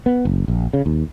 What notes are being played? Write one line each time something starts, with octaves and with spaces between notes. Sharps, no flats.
B3
F#1
A#1
C#3
D#2